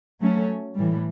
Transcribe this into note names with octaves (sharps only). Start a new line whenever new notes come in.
F#3 A3 C#4
A2 E3 G3